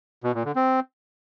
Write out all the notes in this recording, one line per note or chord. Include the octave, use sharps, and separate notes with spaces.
B2
A#2
D3
C4